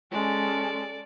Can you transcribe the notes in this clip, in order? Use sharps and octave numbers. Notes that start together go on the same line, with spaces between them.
G#3 C#4 A4 D5